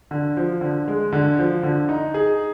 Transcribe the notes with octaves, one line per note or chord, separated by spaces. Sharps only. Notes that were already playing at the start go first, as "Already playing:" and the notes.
D3
F3
D3
G#3
D3
F3
D3
D#4
G#4